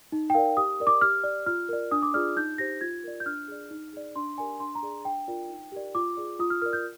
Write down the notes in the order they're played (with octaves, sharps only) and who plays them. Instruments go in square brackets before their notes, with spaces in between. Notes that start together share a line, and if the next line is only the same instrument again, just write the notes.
[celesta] D#4
G5
A#4 D5 F5
G4 D#6
A#4 D5
D6
G4 F6
D5
F4 F6
A#4 D5
D4 D#6
D6
F4 G#4 D5 F6
D#4 G6
G4 C5 A#6
F4 G#6
A#4 D5
G6
D4 F6
G#4 D5
D#4
G#4 D5
D4 C6
G4 A#4 D5 G#5
D4 C6
A#5
G#4 D5
D4 G5
F4 A#4 D5
D#4
G4 A#4 D5
F4 D6
G#4 D5
F4 D#6
F6
A#4 D5 F6
G6